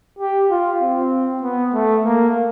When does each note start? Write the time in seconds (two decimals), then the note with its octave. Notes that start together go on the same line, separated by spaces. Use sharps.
0.19 G4
0.51 F4
0.81 C4
1.43 B3
1.74 A3
2.05 A#3